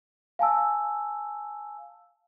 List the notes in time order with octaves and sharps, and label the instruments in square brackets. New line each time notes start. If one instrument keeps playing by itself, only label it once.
[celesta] F5 G#5 A5 E6